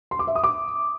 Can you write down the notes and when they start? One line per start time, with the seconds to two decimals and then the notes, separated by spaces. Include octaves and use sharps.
0.11 C6
0.19 D6
0.27 E5
0.35 D#6
0.44 D6